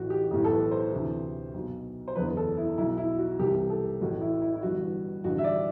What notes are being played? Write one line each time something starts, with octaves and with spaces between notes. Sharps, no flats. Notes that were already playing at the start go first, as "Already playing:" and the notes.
Already playing: A1 A2 E3 F#4
G4
B1 A2 E3 G4
A4
B4
C5
D2 C3 E3
B1 B2
C5
F#1 E2 D3 B4
A4
E4
B1 B2 E4
E4
F#4
C2 C3 E3 G4
A4
A1 A2 E3 F#4
E4
E4
E4
G1 G2 E3 F#4
A1 G2 D3 F#4
E5
D5